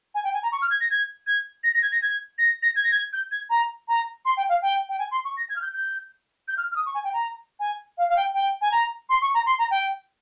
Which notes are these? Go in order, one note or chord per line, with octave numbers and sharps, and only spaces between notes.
G#5
G5
G#5
A#5
C#6
F6
G#6
A#6
G#6
G#6
A#6
A#6
G#6
A#6
G#6
A#6
A#6
G#6
A#6
G#6
G6
G#6
A#5
A#5
C6
G5
F5
G5
G5
G#5
C6
C#6
A#6
G#6
F6
G6
G6
G6
F6
F6
D#6
C#6
G#5
G5
A#5
G#5
F5
F5
G5
G5
G#5
A#5
C6
C#6
A#5
C6
A#5
G5